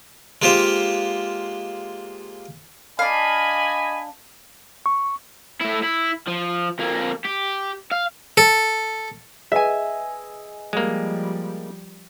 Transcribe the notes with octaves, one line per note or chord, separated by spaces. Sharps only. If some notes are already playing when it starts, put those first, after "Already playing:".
G#3 A#3 F4 G4 C5
D4 D#5 F5 G#5 B5
C#6
A3 E4
E4
F3
F2 A#3
G4
F5
A4
G#4 B4 D#5 E5 G#5
F3 G3 G#3 A#3